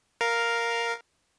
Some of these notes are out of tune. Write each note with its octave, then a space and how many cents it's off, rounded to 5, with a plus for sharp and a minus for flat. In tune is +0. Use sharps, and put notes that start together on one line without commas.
A#4 +0 F5 +0